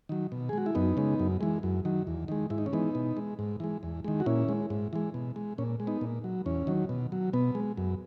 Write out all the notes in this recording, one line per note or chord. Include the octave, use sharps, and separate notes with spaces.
D#3 F#3
B2
G#4
G#3 F#4
E4
F#2 B3 D#4
C#3 G#3
F#2
E3 G#3
F#2
D#3 F#3
E2
D#3 G#3
G#2 E4
D#4
C#4
E3 G#3 B3 D#4
B2
G#3
G#2
E3 G#3
E2
D#3 G#3
F#4
A#2 C#4 E4
G#3
G#2
E3 G#3
B2
G#3
A#2 C#4
G#3
B3 D#4
A#2
F#3
E2 C#4
D#3 F#3
B2
F#3
B2 B3
G#3
F#2